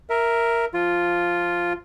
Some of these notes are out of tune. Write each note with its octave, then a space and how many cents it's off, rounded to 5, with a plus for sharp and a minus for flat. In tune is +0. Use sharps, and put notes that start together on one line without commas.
A#4 +0 E5 +0
F3 +0 F4 +0